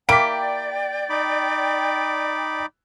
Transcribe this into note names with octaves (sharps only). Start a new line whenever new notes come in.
A#3 E4 G4 D5 G5 B6 D7
D#4 B5 D6